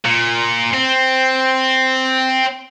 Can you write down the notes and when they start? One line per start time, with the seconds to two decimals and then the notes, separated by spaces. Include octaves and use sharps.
0.05 A#2
0.74 C4